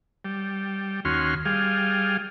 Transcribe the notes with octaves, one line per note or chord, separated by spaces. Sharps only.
G3
D#2 C#4 F#4 C6 F6
G3 G#4 F5